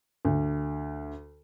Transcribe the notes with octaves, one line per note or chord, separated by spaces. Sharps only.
D2